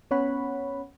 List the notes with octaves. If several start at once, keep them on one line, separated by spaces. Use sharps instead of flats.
B3 C#4 C#5 F#5 B5